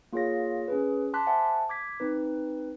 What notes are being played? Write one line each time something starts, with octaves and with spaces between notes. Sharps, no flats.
A#3 F4 G#4 C#5 F5 A#6
C#4 G#4 B4
A5 C6 D6 F#6 B6
C5 E5 F#5 G#5 A5
D6 G#6 B6
C4 D#4 B4